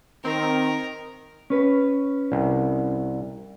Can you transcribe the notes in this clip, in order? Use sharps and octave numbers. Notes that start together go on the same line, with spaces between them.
D#3 C4 A#4
C#4 B4
C2